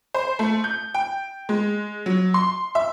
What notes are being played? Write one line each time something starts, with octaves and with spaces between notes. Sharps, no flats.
C5
A3
G6
G5
G#3
F#3
C6
E5